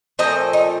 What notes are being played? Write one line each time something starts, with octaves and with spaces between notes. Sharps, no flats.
A#2 F3 A3 C4 D#5
D#4